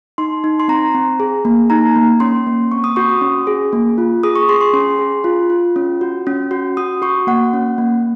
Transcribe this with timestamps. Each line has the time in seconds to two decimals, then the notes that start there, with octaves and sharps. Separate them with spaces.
0.18 D#4 C6
0.44 D#4
0.60 C6
0.68 C4 A#5
0.94 C4
1.20 G#4
1.45 A#3
1.70 D#4 A#5
1.96 A#3
2.20 C#4 C6
2.47 A#3
2.71 C4 C#6
2.84 D#6
2.96 F#4 C#6
3.09 D#6
3.22 C#4
3.47 G#4
3.73 A#3
3.98 F4
4.23 G#4 D#6
4.36 C#6
4.49 G#4 C6
4.61 C6
4.74 C#4 C6
4.99 G#4
5.24 F4
5.50 F4
5.76 C#4
6.01 F#4
6.27 C#4
6.51 F#4
6.77 F#4 D#6
7.02 F#4 C#6
7.27 A#3 F#5
7.53 C#4
7.78 A#3